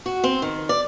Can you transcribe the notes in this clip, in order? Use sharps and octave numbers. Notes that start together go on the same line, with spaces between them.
F#4
C4
D#3
D5